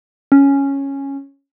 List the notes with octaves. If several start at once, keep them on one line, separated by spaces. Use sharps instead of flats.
C#4